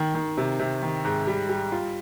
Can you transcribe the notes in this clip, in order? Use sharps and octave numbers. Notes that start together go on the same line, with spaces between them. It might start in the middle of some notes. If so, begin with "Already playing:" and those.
Already playing: D#3
D#3
C3
C3
D#3
G#2
G3
G3
F4